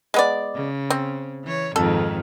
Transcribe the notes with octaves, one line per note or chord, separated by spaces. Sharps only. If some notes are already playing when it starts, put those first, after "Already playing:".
G#3 B3 D5
C#3
C4
E3 C#5
F2 G#2 D#3 A4